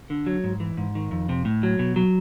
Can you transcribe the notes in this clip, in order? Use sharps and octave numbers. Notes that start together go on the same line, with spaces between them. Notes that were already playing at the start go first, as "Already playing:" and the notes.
D3
F#3
G#2
E3
G#2
D#3
F2
C3
A2
F#3
B2
F#3